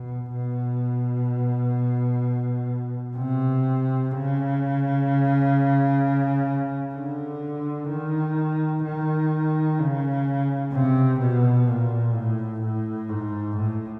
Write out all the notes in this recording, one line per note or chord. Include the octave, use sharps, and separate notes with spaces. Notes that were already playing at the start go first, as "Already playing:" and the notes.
Already playing: B2
B2
C3
C#3
D3
D#3
D#3
C#3
C3
B2
A#2
A2
A2
G#2
A2